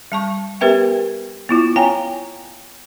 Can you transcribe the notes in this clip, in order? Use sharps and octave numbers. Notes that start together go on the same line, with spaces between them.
G3 A5 C#6
B3 G4 A#4 B4 E5 G5
B3 E4 F4
C#5 F5 G5 G#5 A#5